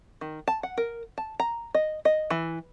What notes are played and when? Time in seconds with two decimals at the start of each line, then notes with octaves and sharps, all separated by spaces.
0.21 D#3
0.48 A5
0.63 F#5
0.78 A#4
1.18 A5
1.40 A#5
1.75 D#5
2.05 D#5
2.30 E3